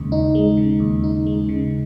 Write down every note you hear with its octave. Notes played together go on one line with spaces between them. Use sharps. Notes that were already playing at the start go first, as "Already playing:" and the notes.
Already playing: D#2 C#3 G#3
D#4
G#3
C#3
D#2
D#4
G#3
C#3